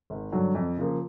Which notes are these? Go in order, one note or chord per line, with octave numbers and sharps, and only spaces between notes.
G#1
G2 D3 F#3
F2
C#3 F3 A#3